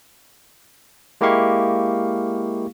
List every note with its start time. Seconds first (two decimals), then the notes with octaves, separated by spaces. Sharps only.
1.21 G#3 A#3 E4 G4 F5 C#6